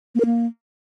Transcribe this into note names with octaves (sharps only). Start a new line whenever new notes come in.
A#3
A#4
A#3